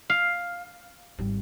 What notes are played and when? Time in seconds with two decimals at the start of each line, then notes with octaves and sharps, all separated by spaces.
0.10 F5
1.19 G#1 G3